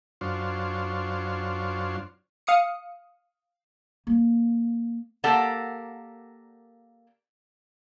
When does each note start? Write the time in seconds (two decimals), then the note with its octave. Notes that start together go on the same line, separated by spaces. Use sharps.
0.21 F#2 D4 F4 C5 C#5
2.47 F5 D#6 C#7
4.07 A#3
5.24 A#3 G4 A4 A#4 D5 F#5